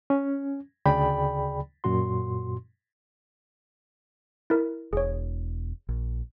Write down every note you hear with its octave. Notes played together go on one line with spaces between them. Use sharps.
C#4
D2 C#3 G#4 D5 G5 B5
F#2 A#2 F#4 C6
E4 A#4
E1 G#4 C#5
A#1